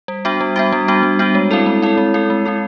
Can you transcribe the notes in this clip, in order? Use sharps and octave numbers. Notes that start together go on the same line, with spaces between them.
G3
B3 D4 F#4
G3
B3 D4 F#4
G3
B3 D4 F#4
G3
B3 D4 F#4
G#3
C4 E4 A4
G#3
C4 E4 A4
G#3
C4 E4 A4
G#3
C4 E4 A4